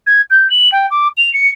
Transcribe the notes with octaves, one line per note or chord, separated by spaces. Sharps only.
G#6
G6
F#7
G5
D6
F7
C#7